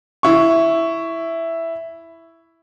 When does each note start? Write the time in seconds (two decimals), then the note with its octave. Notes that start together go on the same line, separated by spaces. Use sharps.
0.23 E4 C#6